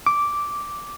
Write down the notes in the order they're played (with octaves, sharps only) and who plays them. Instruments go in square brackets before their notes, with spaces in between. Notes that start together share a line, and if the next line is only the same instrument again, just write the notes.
[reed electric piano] D6